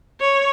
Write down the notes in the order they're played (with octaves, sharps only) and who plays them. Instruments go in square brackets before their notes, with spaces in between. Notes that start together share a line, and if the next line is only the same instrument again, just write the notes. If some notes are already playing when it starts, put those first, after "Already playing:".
[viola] C#5